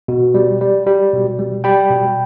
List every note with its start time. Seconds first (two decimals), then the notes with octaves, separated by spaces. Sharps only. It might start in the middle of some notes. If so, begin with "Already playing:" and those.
0.08 B2
0.34 G3
0.61 G3
0.86 G3
1.13 B2
1.39 G3
1.64 G3 G5 B5
1.90 B2